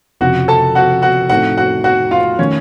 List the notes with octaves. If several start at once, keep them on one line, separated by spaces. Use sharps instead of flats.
F1 F2 C#3 F3 F#4 F#5
A4 A5
F#4 F#5
F#4 F#5
A2 A3 C4 D#4 F#4 A4 F#5
F#4 F#5
F#4 F#5
F4 F5
D#3 A3 C#4 C#5